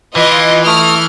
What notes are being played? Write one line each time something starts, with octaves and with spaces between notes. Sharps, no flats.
E3 F4 B4 D#5 C6 D6
A3 D#6 F6